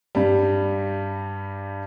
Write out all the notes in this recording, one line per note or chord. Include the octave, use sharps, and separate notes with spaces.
G2 G3